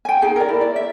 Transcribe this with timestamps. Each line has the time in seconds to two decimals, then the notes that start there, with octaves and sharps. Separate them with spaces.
0.05 G5 G#5
0.21 D#4 G#4 G5
0.36 A#4 D5
0.49 E4
0.61 D5
0.76 E5